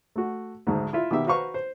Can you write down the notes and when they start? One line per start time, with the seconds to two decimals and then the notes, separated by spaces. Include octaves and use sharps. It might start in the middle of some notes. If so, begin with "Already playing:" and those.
0.16 A3 F#4
0.67 D2 G#2
0.93 E4 F4 E5
1.11 B2 D#3 G4 E5
1.27 F#4 B4 C5 F5 A#5 C#6
1.54 C5